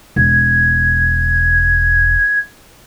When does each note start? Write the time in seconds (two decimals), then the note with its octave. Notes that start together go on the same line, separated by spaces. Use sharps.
0.16 E1 G#6